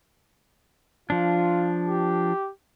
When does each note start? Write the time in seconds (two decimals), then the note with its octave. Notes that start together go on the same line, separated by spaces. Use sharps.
1.10 F3 D4 F4
1.88 G4